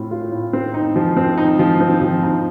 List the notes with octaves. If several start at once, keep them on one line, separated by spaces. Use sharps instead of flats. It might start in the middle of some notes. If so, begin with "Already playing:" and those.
Already playing: A2 C4 F4
F4
A2
C4
D#4
F3
C4
D#4
F3
C4
F3
D#4